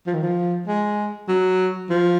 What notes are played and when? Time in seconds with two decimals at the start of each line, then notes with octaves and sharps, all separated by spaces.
0.07 F3
0.14 D#3
0.23 F3
0.67 G#3
1.28 F#3
1.90 F3